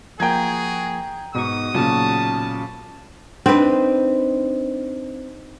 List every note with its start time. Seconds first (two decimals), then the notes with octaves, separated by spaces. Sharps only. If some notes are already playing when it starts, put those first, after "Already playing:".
0.20 F3 A#3 F#4 G#4 G5 A#5 G6 G#6
1.35 G#2 B2 D#4 F#4 C#6 D#6
1.74 A#2 C#3 F#3 A5
3.46 C4 D4 D#4 B4